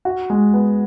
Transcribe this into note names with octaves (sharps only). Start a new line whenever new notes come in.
F#4
G#3
B3